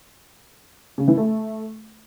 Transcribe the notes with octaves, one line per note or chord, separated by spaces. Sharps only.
C#3
E3
A3